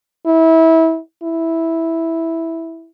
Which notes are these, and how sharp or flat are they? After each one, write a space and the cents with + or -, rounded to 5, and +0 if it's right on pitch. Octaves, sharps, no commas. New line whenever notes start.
E4 -25
E4 -5